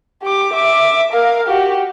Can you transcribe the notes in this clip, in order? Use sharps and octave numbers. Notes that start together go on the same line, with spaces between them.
G4 D6
E5 D6
A#4 F5
F#4 G4